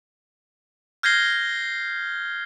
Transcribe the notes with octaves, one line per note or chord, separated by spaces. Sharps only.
F6 G6 G#6 A#6 C7 G7